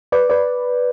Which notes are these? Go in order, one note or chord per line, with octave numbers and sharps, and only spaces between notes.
B4 D5
B4 D5